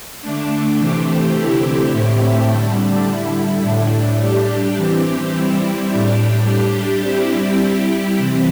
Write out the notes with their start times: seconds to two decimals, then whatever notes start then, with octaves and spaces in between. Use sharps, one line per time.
0.22 D3 A3 D4
0.79 C3 E3 A3 C4 G4
1.35 D3 C4 E4 G4
1.92 A2 A3 C4 E4 G4
2.50 D3 G3 D4
3.06 D3 G3 E4
3.63 A2 A3 D4
4.20 G3 D4 G4
4.76 E3 C4 G4
5.33 G3 C4 E4
5.89 A2 G3 D4 G4
6.47 G3 D4 G4
7.04 G3 C4 E4 G4
7.61 G3 E4 G4
8.18 C3 E3 C4